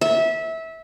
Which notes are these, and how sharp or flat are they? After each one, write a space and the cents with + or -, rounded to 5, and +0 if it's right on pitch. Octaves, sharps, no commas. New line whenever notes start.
E5 -20